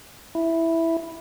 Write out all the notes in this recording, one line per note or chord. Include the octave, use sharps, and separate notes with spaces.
E4